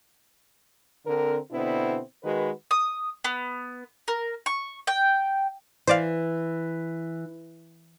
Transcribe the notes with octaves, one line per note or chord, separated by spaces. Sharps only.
D3 C4 A#4
B2 D3 B3 C4 D4 E4
D#3 G#3 F#4 B4
D#6
B3
A#4
C#6
G5
E3 C5 D5 F5